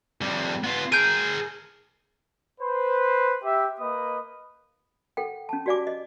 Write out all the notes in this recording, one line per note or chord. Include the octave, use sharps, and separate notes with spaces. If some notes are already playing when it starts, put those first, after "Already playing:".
F2 G3
B3 F4
G#4 A#4 G6 D7 D#7
B4 C5
G4 E5
A#3 B4 D#5 D#6
A4 F#5 G5
C#4 A5
F#4 G4 D5 F5 G#5 D6
D#5